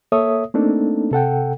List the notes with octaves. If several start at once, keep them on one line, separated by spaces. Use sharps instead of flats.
A#3 A4 C#5 E5 D#6
A3 A#3 C4 D4 D#4 A4
C3 A4 F#5 G5